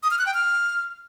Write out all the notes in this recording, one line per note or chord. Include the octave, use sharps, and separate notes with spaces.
D#6
F6
F#6
G5
F6